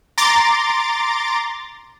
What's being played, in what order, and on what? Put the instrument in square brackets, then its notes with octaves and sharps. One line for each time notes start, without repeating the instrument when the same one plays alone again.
[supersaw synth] A#5 C6 D6 A6